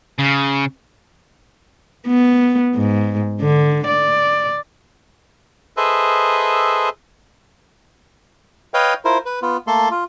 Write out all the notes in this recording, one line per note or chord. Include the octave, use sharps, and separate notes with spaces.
C#3
B3
G#2
D3
D5
G#4 A4 B4 C5 D#5 E5
B4 C#5 D#5 F5 G5
E4 F4 A#4 C5
B4
B3 F4
A3 A#3 A4 C6
F4